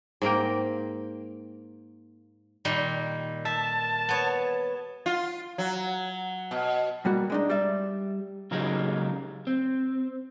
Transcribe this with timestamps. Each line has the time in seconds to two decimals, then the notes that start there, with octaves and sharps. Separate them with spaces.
0.22 G#2 A#3 A#4 G5
2.65 A#2 D#3 G3
3.45 E5 A5
4.09 B3 C#5
5.06 F4
5.58 F#3
6.51 B2
7.05 B2 G3 A#3 F#4
7.30 G#3 D4 D#4
7.50 G3 D5 E5
8.51 C#3 F#3 G#3 A#3 D#4 G4
9.47 C4